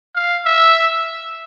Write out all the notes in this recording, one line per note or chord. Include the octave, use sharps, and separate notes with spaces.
F5
E5